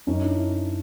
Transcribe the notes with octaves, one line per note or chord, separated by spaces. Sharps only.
F#2 C#4 D#4
D4 E4